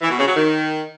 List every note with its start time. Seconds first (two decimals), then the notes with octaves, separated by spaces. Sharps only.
0.01 E3
0.09 B2
0.18 C#3
0.26 F#3
0.35 D#3